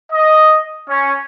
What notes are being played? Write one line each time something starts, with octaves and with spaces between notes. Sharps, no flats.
D#5
C#4